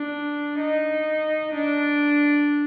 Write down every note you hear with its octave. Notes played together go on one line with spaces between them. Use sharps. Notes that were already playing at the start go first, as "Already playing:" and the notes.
Already playing: D4
D#4
D4